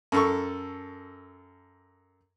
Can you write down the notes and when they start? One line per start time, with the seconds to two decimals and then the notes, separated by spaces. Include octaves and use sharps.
0.12 F#2 A4 C#6